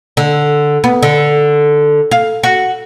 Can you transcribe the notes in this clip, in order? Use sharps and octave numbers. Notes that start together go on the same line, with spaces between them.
D3
B3
D3
F5
F#4